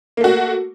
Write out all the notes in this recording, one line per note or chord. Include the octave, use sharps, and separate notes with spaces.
A3 A#3 F#4